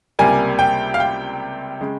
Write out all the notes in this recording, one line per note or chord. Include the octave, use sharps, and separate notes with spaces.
C#2 C3 G3 A#3 G#5
G5
F5
G5
C#3 G#3